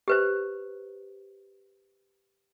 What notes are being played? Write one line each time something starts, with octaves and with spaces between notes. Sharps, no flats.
G4 B4 C5